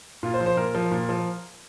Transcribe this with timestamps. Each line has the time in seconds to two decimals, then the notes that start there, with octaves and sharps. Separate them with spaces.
0.23 A#2 F4
0.34 C5
0.40 F3
0.46 C5
0.57 A#2 A#4
0.75 F3
0.91 A#2
1.09 F3